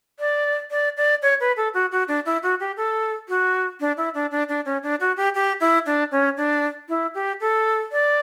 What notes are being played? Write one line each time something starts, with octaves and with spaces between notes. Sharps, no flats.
D5
D5
D5
C#5
B4
A4
F#4
F#4
D4
E4
F#4
G4
A4
F#4
D4
E4
D4
D4
D4
C#4
D4
F#4
G4
G4
E4
D4
C#4
D4
E4
G4
A4
D5